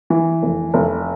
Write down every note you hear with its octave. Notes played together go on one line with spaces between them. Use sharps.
E3
F1
F1